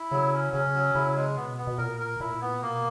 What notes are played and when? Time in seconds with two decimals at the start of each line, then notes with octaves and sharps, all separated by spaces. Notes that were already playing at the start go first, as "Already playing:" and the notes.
Already playing: E4
0.11 C#3 F#3
0.33 C#4
0.53 C#3 C#4
0.74 F#3
0.94 C#3 E4
1.16 G#3
1.37 B2 B3
1.58 B3
1.67 B2
1.78 A#2 A#4
2.00 A#4
2.20 A#2 E4
2.41 B3
2.62 B2 A#3